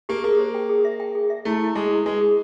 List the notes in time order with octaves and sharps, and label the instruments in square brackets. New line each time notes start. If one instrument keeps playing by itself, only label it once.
[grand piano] A#3 [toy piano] G4
[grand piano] A#3 [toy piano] G#4
[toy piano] C5
G5
G#4
E5
G5
G#4
E5
[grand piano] A3 [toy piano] E4
[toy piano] E4
[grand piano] G#3 [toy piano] G#4
[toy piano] E4
[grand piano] G#3 [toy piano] B4
[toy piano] G#4